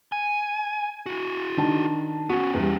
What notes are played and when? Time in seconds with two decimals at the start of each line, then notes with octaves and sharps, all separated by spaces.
0.12 G#5
1.06 E4 F#4
1.57 D#3 D4 A5
2.30 B3 C#4 F#4
2.54 E2 G3